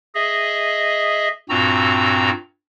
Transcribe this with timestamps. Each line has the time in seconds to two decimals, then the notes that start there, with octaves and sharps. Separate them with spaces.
0.15 G#4 D#5 E5
1.49 G2 A#2 C4 F#4 A#5 E6